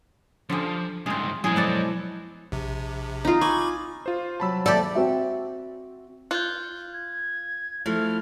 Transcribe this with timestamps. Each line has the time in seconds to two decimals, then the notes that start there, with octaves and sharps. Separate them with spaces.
0.49 D3 F3 G3 G#4
1.06 C2 G#2 C4 G#4
1.44 B2 F3 F#3 G#3 E4 G#4 G#5
1.56 B3 A4 D5
2.52 A#1 C3
3.25 D#4 F4
3.41 G#5 B5 C#6 D6
4.06 F4 C5
4.40 C3 F#3 A5 B5 E6
4.66 D#2 G#2 C3 G4 A4 D5
4.95 C4 F#4 E5
6.31 F4 F#6 G6
6.93 G#6
7.86 F3 A3 E4 F6